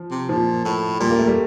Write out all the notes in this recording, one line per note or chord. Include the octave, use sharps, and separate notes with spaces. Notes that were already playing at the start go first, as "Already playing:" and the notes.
Already playing: F3
C3
A#2 F3
A2
A#2 G3
A#3
A3
G3